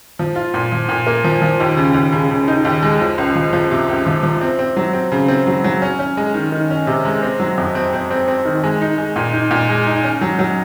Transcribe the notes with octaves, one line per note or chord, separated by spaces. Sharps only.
F3
F4
A#2
F3
A#2
A#3
F3
F3
D#2
C#3
D#2
C#3
C#3
D#4
D#2
G#3
F3
C#2
F3
F3
C3
C#2
F3
F3
C4
C4
F#3
C4
C#3
C4
F#3
F#3
C#4
C#4
G#3
D#3
D#3
C#4
C3
G#3
C4
F#3
F2
C4
C4
C4
C4
D#3
G#3
D#4
G#3
A#2
D#4
A#2
G#3
D#4
C#4
F#3
F#3